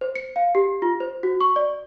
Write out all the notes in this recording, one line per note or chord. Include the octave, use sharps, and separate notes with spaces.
C5
C#7
F5
G4
F4
C5
F#4
C#6
D5